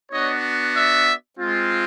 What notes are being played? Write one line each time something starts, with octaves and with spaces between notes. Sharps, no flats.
B3 D4 F#4 C#5 D#5
D5 E5
G#3 C4 F4